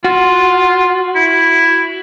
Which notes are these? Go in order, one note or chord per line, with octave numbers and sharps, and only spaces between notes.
F4 F#4
E4